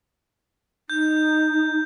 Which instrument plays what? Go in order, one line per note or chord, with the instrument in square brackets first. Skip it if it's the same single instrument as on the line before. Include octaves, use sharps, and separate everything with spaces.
[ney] D#4 [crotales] G6